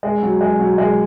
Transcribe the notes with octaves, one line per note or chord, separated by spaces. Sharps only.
G#3
F#3
G#3
F#3
G#3